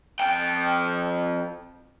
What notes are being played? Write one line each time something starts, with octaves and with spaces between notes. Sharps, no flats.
F2 G5